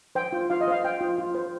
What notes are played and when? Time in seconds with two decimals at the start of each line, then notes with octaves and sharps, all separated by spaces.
0.15 C5 G5
0.33 F4
0.50 F4 F5
0.61 D#5
0.68 C5 F5
0.84 C5 G5
1.01 F4
1.18 F4
1.35 C5